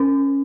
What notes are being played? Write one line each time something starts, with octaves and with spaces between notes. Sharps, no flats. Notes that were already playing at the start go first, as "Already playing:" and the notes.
Already playing: C#4 C5